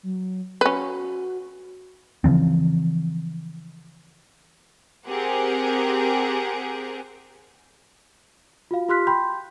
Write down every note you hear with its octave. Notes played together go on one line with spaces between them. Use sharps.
F#3
C#4 F#4 B4
C#3 E3 F3 C4
C4 G4 G#4 A#4 F#5
F4 F#4 F5
F4 G4 C6 F6 F#6 B6
G5 B5 C6 G6